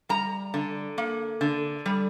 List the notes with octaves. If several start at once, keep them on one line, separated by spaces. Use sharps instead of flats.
G3 A#5
D3
A#3
D3
G3